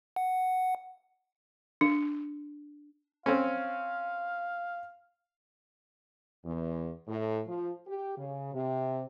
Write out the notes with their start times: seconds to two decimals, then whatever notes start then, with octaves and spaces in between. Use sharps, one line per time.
0.16 F#5
1.81 D4
3.26 C4 C#4 F5
6.45 E2
7.08 A2
7.47 F3
7.87 G4
8.18 C#3
8.53 C3